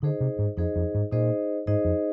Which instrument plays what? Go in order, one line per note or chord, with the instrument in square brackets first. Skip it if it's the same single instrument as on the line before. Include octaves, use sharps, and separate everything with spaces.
[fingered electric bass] D3 [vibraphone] D#4 G#4 C5 D#5
[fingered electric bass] C3
G#2
[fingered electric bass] F2 [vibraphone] D#4 G#4 C5 D#5
[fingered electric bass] F2
G#2
[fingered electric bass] A#2 [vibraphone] D#4 G#4 C5 D#5
[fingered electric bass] G#2 [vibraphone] D#4 G#4 C5 D#5
[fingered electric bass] F2